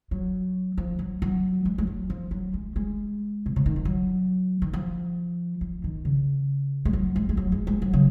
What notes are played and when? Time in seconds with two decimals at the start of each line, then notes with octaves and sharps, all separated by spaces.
0.11 F#3
0.78 F3
0.99 F#3
1.22 F#3
1.65 G#3
1.78 G#3
1.87 F#3
2.10 F3
2.31 F#3
2.54 G#3
2.76 G#3
3.46 C3
3.56 C#3
3.66 D#3
3.76 F3
3.85 F#3
4.62 D#3
4.73 F3
5.61 F3
5.84 D#3
6.05 C#3
6.85 G#3
6.93 F#3
7.16 G#3
7.29 G#3
7.37 F#3
7.52 G#3
7.67 G#3
7.82 F#3
7.93 C#3